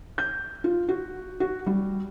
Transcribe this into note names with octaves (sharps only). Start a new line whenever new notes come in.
G6
F4
F#4
F#4
G3